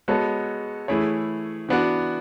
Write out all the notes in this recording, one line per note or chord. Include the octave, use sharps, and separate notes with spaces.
G#3 B3 F#4 A4 C#5
E3 A3 E4 G#4 C#5
E3 B3 D4 F#4